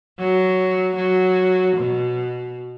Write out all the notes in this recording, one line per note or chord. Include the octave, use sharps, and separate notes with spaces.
F#3
F#3
B2